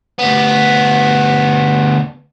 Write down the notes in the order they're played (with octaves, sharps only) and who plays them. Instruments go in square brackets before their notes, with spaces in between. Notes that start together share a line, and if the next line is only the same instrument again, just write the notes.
[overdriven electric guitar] D2 B3